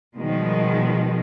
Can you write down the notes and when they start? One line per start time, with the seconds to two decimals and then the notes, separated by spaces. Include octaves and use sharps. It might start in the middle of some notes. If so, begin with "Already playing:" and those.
0.16 B2 D#3 F3 G3 G#3